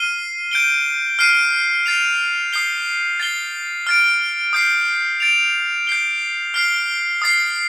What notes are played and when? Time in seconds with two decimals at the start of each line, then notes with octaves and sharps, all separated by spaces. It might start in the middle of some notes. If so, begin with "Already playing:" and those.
Already playing: F6 C7 D#7 G7
0.51 G6 D7 G7
1.19 F6 C7 D#7
1.86 A6 C7 F7
2.53 D#6 G6 C7 G7
3.20 A6 C7 G7
3.87 F6 A6 D7
4.53 D#6 G6 C7
5.20 A6 D7 F7
5.87 G6 C7 G7
6.54 F6 C7 G7
7.22 D#6 A6 C7